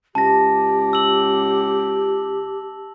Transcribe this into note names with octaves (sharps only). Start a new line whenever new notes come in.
C#2 G4 A5 A#6
E6 F#7